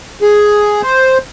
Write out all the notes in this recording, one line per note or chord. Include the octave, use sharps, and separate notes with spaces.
G#4
C5